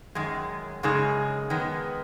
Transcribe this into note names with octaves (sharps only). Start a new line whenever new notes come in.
F#2 D#3 G#3
F#2 C#3 G#3 D#4 G#4
D#3 G#3 B3